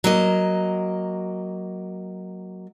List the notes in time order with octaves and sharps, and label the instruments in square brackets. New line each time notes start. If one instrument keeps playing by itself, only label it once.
[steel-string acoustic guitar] F#3 A#3 D#5